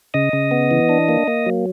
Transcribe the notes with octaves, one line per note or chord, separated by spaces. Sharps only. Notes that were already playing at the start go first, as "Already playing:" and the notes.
C#3 D#5 D#6
C#3
B3
E3
D4
A#3
A#3
F#3